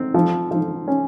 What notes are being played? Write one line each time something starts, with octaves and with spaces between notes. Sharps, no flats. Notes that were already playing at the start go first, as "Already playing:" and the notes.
Already playing: C4
F3
F3
C#4